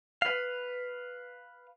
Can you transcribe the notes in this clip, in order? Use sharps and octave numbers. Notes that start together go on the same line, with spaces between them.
B4 F5